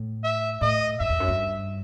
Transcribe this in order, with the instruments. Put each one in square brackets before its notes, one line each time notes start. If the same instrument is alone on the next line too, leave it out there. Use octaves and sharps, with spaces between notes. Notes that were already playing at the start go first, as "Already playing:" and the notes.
Already playing: [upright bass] A2
[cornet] E5
[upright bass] A2 [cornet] D#5
[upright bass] F#2 [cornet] E5
[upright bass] E2
F#2
G2